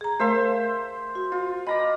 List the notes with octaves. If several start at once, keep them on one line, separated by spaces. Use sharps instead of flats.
G#4 A#5
A3 A#4 C5 E5 F5 C6
F#4
F4
D5 D#5 A#5 B5